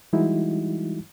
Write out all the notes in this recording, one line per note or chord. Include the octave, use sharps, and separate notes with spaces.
E3 G3 G#3 D#4 E4 F#4